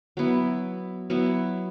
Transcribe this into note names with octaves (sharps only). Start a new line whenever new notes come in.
F#3 B3 E4
F#3 B3 E4